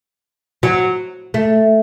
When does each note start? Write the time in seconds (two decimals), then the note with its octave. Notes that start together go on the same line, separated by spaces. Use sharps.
0.63 F#3
1.34 A3